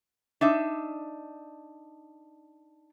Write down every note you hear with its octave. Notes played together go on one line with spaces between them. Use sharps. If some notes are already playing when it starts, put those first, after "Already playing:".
D4 D#4 E5